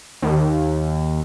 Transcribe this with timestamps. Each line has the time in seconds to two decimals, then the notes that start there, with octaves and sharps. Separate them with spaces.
0.22 D#2